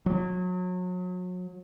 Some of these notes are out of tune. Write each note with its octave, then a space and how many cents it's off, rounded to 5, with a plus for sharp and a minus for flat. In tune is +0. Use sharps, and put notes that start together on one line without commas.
F#3 -30